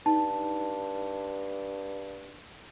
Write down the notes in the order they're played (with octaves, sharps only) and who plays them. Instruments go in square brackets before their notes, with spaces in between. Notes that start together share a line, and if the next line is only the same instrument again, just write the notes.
[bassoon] G2 [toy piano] D#4 [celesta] A5